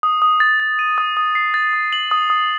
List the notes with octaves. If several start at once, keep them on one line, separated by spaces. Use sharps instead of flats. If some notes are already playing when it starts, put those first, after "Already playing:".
D#6
D#6
A6
A6
D#7
D#6
D#6
C7
A6
D#6
F#7
D#6
D#6